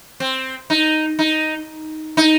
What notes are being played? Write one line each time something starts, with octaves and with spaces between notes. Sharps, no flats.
C4
D#4
D#4
D#4